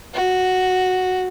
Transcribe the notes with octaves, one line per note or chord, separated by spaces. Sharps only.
F#4